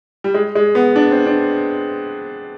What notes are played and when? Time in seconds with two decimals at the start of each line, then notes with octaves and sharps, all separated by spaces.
0.24 G3
0.34 G#3
0.55 G#3
0.75 B3
0.96 D4
1.11 C4
1.26 D4